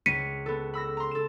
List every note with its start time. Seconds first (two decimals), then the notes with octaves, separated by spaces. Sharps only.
0.06 C#2 B6 C#7 D#7
0.46 B3 A4
0.74 B5 E6 A#6
0.97 A#5 C6
1.11 A4 E7